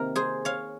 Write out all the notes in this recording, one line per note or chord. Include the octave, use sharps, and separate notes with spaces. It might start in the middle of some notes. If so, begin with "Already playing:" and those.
Already playing: C3 D#3 A#3 A#4
G#4 C5
C#5 F5